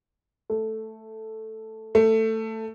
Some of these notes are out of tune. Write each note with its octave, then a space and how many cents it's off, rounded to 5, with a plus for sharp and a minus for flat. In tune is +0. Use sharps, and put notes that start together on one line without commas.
A3 +0
A3 +15